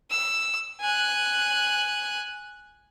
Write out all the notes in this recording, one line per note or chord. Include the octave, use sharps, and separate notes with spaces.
E6
G#5 F#6